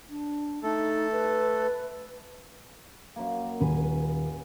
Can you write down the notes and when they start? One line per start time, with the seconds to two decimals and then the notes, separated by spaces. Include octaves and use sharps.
0.10 D4
0.63 A3 D#4 A4
1.12 B4
3.16 F#2 A#3
3.60 D#1 B4 G#5